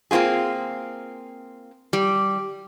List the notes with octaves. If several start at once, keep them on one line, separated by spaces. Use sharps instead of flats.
A#3 C4 E4 F4 G#4
G3